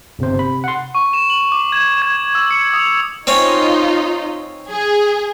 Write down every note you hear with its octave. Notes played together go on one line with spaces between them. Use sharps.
G1 C3 C5
B5
F#5 C6
C#6
E7
F#7
D6
G#6
G#6
E6
C#7
D#6
C4 C#4 D#4 F4 D#5
G#4